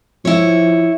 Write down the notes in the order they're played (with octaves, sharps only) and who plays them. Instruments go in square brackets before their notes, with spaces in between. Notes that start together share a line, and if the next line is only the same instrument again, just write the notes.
[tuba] F3 [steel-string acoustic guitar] E4 C#5